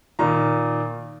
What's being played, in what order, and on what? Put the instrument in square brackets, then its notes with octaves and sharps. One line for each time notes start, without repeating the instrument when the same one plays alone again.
[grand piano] A#2 D#3 A#5